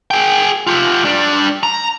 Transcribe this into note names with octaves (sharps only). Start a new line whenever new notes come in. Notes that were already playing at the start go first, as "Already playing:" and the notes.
G#4 G5
F4 G4
G3 D4
A#5